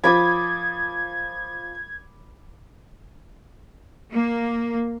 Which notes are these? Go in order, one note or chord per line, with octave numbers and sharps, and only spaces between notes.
F3 B5 D6 D#6 G#6
A#3